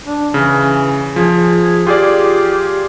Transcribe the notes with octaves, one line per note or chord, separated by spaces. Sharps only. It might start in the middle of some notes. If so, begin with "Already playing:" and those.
D4
C#3 E3
F3 G#4
F4 G4 G#4 D5